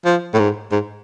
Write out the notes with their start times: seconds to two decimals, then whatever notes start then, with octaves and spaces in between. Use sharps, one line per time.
0.05 F3
0.34 A2
0.39 G#2
0.72 G#2